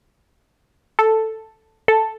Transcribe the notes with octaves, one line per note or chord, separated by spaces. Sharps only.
A4
A4